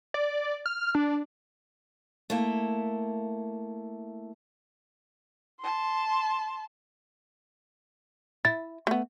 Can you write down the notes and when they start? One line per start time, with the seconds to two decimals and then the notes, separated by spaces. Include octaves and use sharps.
0.14 D5
0.66 F6
0.95 D4
2.30 A3 A#3 E4
5.60 A5 C6
8.45 E4 A6
8.87 A3 B3